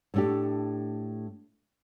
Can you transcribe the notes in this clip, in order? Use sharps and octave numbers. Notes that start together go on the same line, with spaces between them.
A2 A3 D4 G4